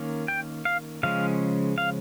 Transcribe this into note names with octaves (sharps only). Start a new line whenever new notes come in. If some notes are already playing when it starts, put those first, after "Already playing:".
Already playing: D#3 A#3 C#4
G5
F5
C#3 F3 G#3 C#4 F5
F5